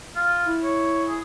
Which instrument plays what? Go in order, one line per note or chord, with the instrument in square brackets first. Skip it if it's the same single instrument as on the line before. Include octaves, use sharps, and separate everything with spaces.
[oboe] F4
[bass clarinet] E4
[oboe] C#5
G#4